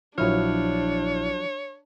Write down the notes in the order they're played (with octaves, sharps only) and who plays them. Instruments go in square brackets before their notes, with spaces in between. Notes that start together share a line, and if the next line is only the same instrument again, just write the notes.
[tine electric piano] A#1 E4 F6 [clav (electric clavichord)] F3 F#3 [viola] D4 [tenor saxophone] C#5